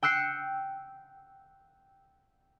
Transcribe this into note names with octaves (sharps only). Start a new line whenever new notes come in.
G5 E6 F#6 C7 C#7